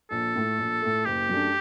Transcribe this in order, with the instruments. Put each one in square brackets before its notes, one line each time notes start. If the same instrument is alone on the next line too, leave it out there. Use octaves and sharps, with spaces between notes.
[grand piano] A#1 [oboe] A4
[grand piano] A2 A3
A#1
A2 A3
[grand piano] F#1 [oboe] G4
[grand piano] F#2 F#3 A3 D4